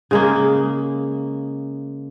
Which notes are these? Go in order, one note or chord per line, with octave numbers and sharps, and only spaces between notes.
C#3 G#3 A#3